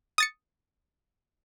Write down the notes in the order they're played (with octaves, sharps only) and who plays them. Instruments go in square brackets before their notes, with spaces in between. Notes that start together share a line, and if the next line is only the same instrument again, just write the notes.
[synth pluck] D#6 A6 C#7